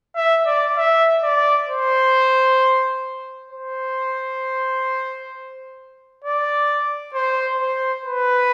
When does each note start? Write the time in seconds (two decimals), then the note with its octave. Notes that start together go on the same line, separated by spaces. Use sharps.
0.16 E5
0.46 D5
0.77 E5
1.23 D5
1.68 C5
3.50 C5
6.24 D5
7.14 C5
7.61 C5
8.06 B4